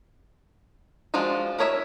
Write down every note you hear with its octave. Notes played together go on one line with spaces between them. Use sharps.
F3 G#3 D4 F4 F#4
E4 A#4 C#5 D#5 E5